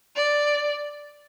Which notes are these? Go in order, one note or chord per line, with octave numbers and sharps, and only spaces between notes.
D5